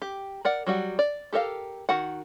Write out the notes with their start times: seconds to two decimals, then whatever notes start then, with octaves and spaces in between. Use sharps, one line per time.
0.02 G4
0.45 A#4 D5 F#5
0.67 F#3 G3 F#4
0.99 D5
1.33 G4 A4 A#4 E5 F5
1.89 D#3 F#4 F#5